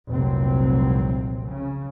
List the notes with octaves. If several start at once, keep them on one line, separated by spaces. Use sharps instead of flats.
F1 C2 A#2 F#3 C4
C#3